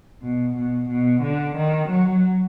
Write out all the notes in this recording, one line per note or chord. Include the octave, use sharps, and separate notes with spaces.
B2
B2
B2
D3
D#3
F#3